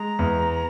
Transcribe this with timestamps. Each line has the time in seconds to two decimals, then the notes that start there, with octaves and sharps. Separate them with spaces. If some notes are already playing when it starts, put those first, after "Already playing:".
Already playing: G#3 A#5
0.19 E2